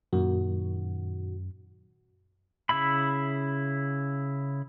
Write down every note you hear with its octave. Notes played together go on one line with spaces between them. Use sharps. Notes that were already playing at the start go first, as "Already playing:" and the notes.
F#2 A#2 D#3 F#4
C#3 E4 E5 B5